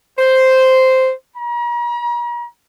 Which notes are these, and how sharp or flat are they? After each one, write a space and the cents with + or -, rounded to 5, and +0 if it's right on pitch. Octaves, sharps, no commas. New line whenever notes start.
C5 -5
A#5 +40